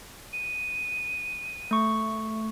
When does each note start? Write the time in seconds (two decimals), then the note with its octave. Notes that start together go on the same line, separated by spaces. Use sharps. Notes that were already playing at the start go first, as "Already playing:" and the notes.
0.33 D#7
1.71 A3 C#6